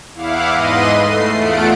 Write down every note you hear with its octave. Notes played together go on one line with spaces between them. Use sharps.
E2 E4 F5 F#5 D6
G#2 B4 D#5 C6 D#7
A3 C7
E2 A3 F4 F#5 D7